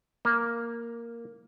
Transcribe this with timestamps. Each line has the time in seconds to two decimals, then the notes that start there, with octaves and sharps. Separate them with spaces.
0.25 A#3